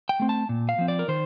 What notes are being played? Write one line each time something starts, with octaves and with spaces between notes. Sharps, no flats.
G5
A3 C4
A5
A#2
F5
F3 C4
D5
A#4
D#3 C5